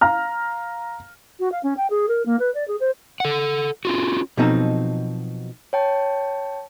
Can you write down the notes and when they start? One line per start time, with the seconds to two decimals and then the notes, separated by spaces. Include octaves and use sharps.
0.01 F5 A#5 F6
1.40 F#4
1.52 F5
1.63 C#4
1.77 G5
1.90 G#4
2.08 A#4
2.26 A#3
2.39 B4
2.54 D5
2.68 G#4
2.80 C5
3.20 A4 F#5
3.85 C#4 F4 F#4
4.37 B2 F3 F#3 C4 D#4 A4
5.73 C#5 G5 A5